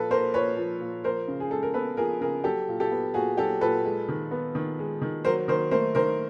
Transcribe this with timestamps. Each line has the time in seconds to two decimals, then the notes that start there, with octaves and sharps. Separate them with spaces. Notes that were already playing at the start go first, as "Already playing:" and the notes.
Already playing: A#2 F3 A4 B4
0.10 A#3 A#4 C5
0.33 A#2 B4 C#5
0.57 F3
0.81 A#2
1.04 F3 A#4 C5
1.28 C#3
1.40 G#4
1.51 G#3 A4
1.63 A#4
1.74 B3 A4 B4
1.97 F3 G#4 A#4
2.20 C#3 G#4 A#4
2.44 F#3 G4 A4
2.68 A#2
2.80 G4 A4
2.91 B3
3.14 A#2 F#4 G#4
3.37 F#3 G4 A4
3.61 A#2 A4 B4
3.85 G#3
4.08 D#3
4.31 B3
4.55 D#3
4.79 G#3
5.02 D#3
5.25 F#3 A#4 C5
5.48 D#3 A#4 C5
5.71 A3 A#4 C5
5.95 D#3 A#4 C5